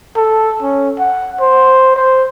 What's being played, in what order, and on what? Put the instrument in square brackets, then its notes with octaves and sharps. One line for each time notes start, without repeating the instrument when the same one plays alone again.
[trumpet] A4
C#4
F#5
C5
C5